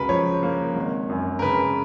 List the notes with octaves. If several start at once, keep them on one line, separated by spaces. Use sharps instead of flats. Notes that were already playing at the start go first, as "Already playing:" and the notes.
Already playing: C#2 C#3 F#4 A#4 B4
F3 C#5
A#3
G#1
F#2
A#4
C#3 B4